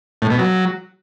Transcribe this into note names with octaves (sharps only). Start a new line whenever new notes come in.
A2
B2
F#3